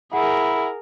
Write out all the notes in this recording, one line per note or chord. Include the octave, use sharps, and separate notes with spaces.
E4 G#4 A#4 F#5